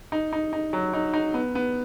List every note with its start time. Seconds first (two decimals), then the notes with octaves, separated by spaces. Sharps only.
0.12 D#4
0.33 D#4
0.53 D#4
0.73 F#3
0.93 D#4
1.13 D#4
1.34 B3
1.55 B3